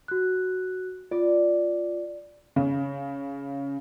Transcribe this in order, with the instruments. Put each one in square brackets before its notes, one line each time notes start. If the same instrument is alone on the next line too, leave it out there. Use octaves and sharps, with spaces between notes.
[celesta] F#4 F#6
[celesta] F4 [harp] D5
[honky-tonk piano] C#3